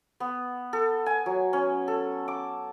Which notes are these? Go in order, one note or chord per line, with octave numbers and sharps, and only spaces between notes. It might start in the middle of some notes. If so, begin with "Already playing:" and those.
B3
A4
G#5
F#3
C#4
A4
D6